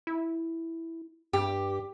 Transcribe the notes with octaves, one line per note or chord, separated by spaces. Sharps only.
E4
G2 G4